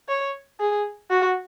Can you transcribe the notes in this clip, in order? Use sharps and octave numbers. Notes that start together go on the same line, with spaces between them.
C#5
G#4
F#4